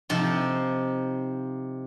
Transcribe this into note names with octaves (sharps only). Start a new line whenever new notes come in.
C3 F3 D#4